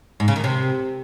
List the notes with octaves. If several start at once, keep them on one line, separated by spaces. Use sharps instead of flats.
G#2
C#3
D#3
C3